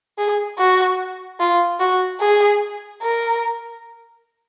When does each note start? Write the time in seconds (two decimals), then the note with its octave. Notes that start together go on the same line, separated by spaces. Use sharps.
0.18 G#4
0.59 F#4
1.40 F4
1.80 F#4
2.21 G#4
3.02 A#4